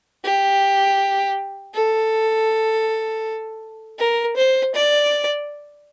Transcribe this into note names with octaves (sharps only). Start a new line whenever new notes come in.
G4
A4
A#4
C5
D5